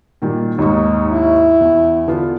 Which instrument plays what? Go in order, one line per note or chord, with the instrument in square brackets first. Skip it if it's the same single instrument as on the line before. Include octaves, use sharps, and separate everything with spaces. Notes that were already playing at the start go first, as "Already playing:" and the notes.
[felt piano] A#2 D#3 G3
[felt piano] D#2 G#2 C#6 [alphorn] D#4
[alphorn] E4
[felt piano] E2
D3 B3 F4